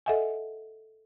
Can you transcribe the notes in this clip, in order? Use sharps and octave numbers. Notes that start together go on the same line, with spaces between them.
A4 D#5 E5 F#5 G#5